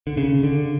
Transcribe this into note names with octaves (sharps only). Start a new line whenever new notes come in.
D3
C#3
D3